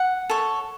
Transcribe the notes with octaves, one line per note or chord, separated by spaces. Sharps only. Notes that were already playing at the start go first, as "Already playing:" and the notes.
Already playing: F#5
A4 C#5